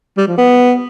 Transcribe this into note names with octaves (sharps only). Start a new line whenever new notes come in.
G3
F3
B3